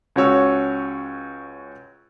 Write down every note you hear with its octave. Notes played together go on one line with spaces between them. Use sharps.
C#2 C#4 F#4 C#5 E6